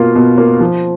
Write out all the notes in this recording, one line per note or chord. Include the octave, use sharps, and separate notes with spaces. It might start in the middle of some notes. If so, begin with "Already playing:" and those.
Already playing: B2 A#3 F4
B2
A#3 F4
F3